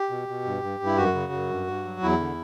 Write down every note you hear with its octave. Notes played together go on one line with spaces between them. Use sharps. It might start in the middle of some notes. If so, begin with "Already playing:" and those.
Already playing: G4
B2
B2
G2
G2
G2
E4
F#2 F#4
C#3
F#2
G2
G2
F#3
E2 E4
D3